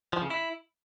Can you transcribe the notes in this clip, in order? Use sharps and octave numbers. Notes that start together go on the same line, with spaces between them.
F3
C#3
E4